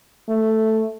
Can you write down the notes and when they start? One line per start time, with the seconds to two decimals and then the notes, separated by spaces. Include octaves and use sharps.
0.29 A3